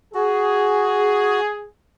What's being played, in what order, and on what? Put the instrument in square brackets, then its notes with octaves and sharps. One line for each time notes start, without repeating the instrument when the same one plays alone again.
[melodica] F#4 [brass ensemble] G#4